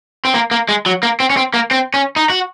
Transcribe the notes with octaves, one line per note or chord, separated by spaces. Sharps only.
C4
A#3
A#3
G#3
F#3
A#3
C4
C#4
C4
A#3
C4
C#4
D#4
F#4